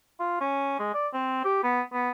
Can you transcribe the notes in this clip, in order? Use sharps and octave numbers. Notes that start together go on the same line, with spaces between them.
F4
C#4
G#3
D5
C4
G4
B3
B3